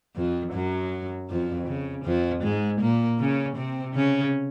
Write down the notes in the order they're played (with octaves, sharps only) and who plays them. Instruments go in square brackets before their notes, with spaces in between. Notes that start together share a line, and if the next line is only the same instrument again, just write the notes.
[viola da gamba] F2 F3
F#2 F#3
F2 F3
C#3
F2 F3
G#2 G#3
A#2 A#3
C#3 C#4
C3 C4
C#3 C#4